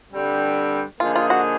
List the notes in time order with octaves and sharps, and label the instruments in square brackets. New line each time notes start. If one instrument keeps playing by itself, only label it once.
[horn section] G2 D3 G3 C4
[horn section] D3 F3 A#3 D#4 G#4 [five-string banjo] F4
[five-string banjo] F4
F#4